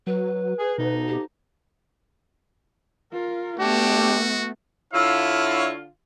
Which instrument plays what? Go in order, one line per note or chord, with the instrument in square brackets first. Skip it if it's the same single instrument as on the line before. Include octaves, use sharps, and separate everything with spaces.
[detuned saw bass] F#3 [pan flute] B4
[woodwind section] G#4
[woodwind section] D2 D#4 [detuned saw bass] B2
[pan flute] G4
[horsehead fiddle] F4 A#4
[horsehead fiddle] A3 B3 [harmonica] D4 G4 [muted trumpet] F#4
[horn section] D3 F4 F5 [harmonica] E4 C#5 E5